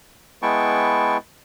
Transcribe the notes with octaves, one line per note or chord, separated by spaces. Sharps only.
G#3 B3 E4 G5 A5 C#6